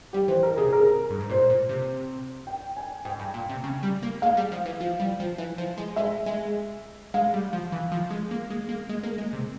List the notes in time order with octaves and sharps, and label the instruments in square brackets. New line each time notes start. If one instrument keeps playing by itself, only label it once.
[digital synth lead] G3 [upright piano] G4
[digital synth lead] E3 [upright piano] C5
[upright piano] A#4
[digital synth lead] C3 [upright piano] G#4
[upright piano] A#4
[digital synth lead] G2
G#2
[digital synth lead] A#2 [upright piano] C5
[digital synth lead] A#2
C3
[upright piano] G5
G#5
[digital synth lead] G#2 [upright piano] G5
[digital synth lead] G2
A#2
C3
C#3
G3
A#3
[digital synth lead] G#3 [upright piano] F5
[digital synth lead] G3
F3
E3
F3
G3
F3
E3
F3
G#3
[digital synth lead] G#3 [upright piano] E5
[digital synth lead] G#3
[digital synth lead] G#3 [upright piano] F5
[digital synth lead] G3
F3
E3
F3
G#3
A#3
G#3
A#3
G#3
A#3
G#3
C3